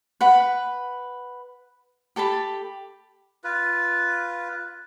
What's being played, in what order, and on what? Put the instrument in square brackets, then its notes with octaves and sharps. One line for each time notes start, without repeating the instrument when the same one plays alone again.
[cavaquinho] B4 F#5 B5
G4 A4 A5 B5
[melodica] F4 B4